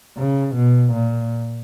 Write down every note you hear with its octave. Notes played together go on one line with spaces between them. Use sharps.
C#3
B2
A#2